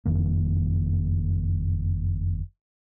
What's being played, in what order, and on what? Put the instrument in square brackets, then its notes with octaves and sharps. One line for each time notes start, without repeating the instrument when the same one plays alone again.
[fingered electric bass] F#1 F2 D#3 A#3